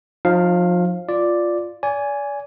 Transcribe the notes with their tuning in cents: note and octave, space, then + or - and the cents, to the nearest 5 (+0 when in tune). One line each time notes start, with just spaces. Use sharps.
F3 +35 D#4 -15 F5 +0
F4 +0 D5 +0
D5 -35 G#5 +0